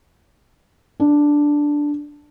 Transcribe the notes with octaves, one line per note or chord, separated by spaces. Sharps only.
D4